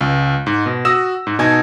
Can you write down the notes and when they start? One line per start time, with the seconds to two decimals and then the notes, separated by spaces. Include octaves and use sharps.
0.01 C#2
0.47 G#2
0.66 B2
0.85 F#4 D#6 E6 A#6 E7
1.27 G#2
1.39 B2 D#4 G#5 A5 G#6